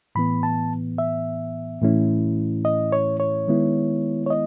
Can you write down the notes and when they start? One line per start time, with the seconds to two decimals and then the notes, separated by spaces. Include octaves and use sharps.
0.15 A2 E3 B3 B5
0.43 A5
0.98 E5
1.82 A2 E3 A3 C#4 E4
2.65 D#5
2.92 C#5
3.20 C#5
3.48 D#3 G#3 B3 E4
4.26 C#5
4.30 D#5